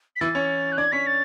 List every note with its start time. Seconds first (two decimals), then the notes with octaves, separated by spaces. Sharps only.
0.16 B6
0.21 E3 E4 A6
0.35 C#4 C#5
0.72 F#6
0.77 D4 D5 G#6
0.92 C#4 C#5 B6
1.07 A6